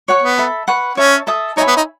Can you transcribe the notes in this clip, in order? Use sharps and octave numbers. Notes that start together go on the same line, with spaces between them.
C#5 F#5 C#6
B3
A4 E5 B5
B4 F#5 C#6
C#4 C#5 E5 A5
A4 E5 A5 D#6
D#4 C#5 E5 G#5 B5
B3
D#4